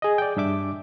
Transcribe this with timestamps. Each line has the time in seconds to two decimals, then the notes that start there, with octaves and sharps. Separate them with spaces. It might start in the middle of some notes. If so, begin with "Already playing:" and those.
0.02 G#4 D#5
0.18 D5 G5
0.37 G2 D4 E5 D6